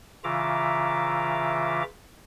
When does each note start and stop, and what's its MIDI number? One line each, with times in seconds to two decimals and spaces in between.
0.24 1.83 49
0.24 1.83 52
0.24 1.83 65
0.24 1.83 76
0.24 1.83 82
0.24 1.83 86